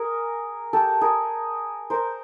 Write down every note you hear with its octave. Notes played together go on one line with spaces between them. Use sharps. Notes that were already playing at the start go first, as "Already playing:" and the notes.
Already playing: G#4 A#4
G4 A4
G#4 A#4
A#4 C5